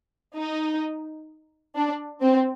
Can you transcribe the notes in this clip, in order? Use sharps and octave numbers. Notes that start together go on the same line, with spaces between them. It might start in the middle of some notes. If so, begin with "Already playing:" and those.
D#4
D4
C4